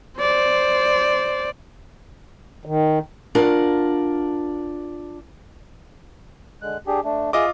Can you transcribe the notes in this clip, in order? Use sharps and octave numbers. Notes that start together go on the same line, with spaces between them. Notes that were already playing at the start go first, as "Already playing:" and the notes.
C5 D5
D#3
D4 F4 A#4 F#5
D3 G#3 F#6
D4 G4 G#4
A3 D4
F4 G#4 D#5 E5 D6